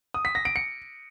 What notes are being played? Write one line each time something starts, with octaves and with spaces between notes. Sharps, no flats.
D#6
B6
A#6
D7
C#7